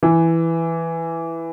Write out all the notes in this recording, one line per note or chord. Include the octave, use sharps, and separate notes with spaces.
E3